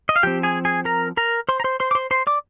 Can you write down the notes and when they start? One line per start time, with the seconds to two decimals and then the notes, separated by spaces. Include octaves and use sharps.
0.09 D#5
0.16 F5
0.23 F3 C4 G4 G5
0.43 G#4 G#5
0.65 G#4 G#5
0.85 A#4 A#5
1.17 A#4 A#5
1.49 C5 C6
1.60 A#5
1.64 C5 C6
1.80 C5 C6
1.91 D6
1.95 C5 C6
2.11 C5 C6
2.27 D5 D6